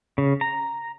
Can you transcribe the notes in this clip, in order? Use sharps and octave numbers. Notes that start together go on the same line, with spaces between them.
C#3
A#5